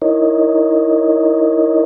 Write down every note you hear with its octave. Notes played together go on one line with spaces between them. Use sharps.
D#4 E4 A#4 C#5 D#5